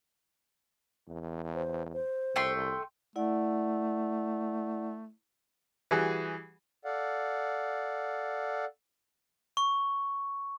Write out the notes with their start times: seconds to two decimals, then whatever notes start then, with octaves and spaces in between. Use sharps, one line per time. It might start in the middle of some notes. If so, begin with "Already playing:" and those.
1.08 E2
1.54 C5
1.94 C5
2.36 C2 A3 G5 C6
3.16 A3 E4 D5 F#5
5.91 E3 G3 F#4 G#4
6.85 A4 D5 F5 F#5
9.57 C#6